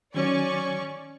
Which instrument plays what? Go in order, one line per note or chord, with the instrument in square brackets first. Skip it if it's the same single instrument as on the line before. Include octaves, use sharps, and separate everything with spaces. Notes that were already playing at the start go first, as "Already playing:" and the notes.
[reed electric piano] D#3 F#3 [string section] C#4 D5 C#6